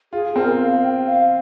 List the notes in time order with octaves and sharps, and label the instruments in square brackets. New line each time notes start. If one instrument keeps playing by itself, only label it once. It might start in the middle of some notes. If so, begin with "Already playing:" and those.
[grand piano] F4 [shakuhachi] G#4
[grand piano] C4 [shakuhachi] A#4
[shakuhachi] F5
G5
F5